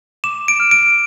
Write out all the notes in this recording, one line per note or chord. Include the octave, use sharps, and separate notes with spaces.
D6 E7
D7
F6
D7